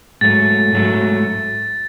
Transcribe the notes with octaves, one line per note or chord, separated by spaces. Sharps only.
G#2 F#3 A3 A6
G#2 F#3 A3